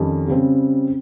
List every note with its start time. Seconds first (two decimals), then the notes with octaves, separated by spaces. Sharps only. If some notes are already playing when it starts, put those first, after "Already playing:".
Already playing: F2 D#3 G3 C#4
0.28 C#3 G3 C4